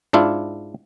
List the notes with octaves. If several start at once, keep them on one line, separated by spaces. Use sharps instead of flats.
G#2 D4 E4 F4